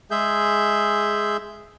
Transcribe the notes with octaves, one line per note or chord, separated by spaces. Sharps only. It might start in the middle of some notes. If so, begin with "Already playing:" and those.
G#3 G#4 E5 G6